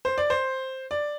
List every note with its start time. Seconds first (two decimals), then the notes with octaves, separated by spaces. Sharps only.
0.05 C5
0.18 D5
0.30 C5
0.91 D5